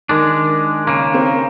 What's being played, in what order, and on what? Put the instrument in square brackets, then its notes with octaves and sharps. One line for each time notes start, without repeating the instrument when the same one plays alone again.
[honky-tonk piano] D#3 [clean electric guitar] G#3 D4
[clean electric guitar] C#3 A#3
[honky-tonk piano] C4